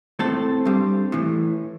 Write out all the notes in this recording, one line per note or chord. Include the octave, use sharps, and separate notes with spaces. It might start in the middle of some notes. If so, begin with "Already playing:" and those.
A2 A3 C4 A4
G2 G3 C4
A2 E3